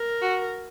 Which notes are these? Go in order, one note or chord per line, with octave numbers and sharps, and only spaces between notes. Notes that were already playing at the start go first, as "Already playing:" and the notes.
Already playing: A#4
F#4